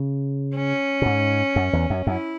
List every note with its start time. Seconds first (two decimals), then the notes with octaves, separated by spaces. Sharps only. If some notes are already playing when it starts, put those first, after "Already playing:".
Already playing: C#3
0.55 C#4
1.02 B2
1.06 G#2
1.56 F#2
1.73 E2
1.90 F#2
2.07 F#2 E4